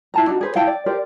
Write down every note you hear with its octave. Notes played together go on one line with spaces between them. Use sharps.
E4 A5 A#5
D4 D#4 F#4
G#4 B4 C5
E4 F5 G5 A5
D5
G4 A#4 C5 D5